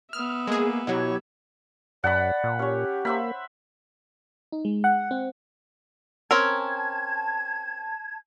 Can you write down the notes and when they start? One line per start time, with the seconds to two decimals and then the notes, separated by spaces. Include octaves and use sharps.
0.13 B3 E5 D#6 F6
0.47 G#3 A#3 G#4
0.87 B2 F#3 E4 G4 C#5 G#6
2.04 F#2 D5 F#5 A5 B5
2.44 A#2
2.59 C#4 G4 C#5
3.05 A#3 C5 E5 B5
4.52 D#4
4.65 G#3
4.84 F#5
5.11 C4
6.31 C4 C#4 A#4 A5 G#6